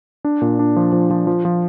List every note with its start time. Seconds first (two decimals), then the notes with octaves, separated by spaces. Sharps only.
0.25 D4
0.41 A#2
0.59 D4
0.76 F3
0.92 F3
1.11 F3
1.27 F3
1.45 F3